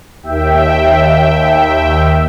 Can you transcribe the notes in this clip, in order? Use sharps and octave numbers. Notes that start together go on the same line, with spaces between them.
D#2 E5 G5